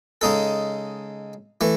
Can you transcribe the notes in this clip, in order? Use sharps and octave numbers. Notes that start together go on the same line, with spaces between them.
C#3 G#3 D#4 A4
E3 A3